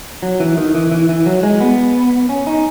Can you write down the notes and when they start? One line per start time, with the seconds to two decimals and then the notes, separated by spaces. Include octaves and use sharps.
0.23 F#3
0.40 E3
0.57 D#3
0.75 E3
0.92 E3
1.09 E3
1.26 F#3
1.43 G#3
1.61 B3
2.29 C#4
2.47 D#4